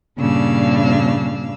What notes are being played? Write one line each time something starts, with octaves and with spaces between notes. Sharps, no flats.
G2 A#2 C#3 D4 F5 E6